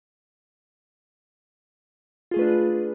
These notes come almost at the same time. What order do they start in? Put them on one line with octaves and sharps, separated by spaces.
F4 G#4 A3 B4 D4